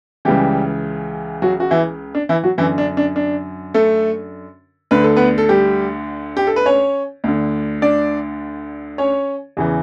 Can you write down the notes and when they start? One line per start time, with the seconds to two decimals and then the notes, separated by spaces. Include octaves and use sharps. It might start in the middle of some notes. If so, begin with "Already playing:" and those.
0.25 C#2 C#3 E3 G3 G4
1.42 F#3 F#4
1.60 F#4
1.71 E3 E4
2.15 D4
2.29 E3 E4
2.44 F#3 F#4
2.58 F#2 D3 E3 E4
2.78 D4
2.97 D4
3.16 D4
3.74 A3 A4
4.91 D2 D3 B4
5.04 A4
5.16 B3 B4
5.38 A4
5.49 G3 G4
6.37 G4
6.47 A4
6.56 B4
6.66 C#4 C#5
7.24 D2 D3
7.82 D4 D5
8.98 C#4 C#5
9.57 E2 C#3 E3